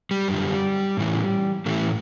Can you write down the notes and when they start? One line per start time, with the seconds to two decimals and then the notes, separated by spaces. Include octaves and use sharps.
0.11 G3
0.28 F#2 D3
0.97 A2 E3
1.66 A2 E3 A3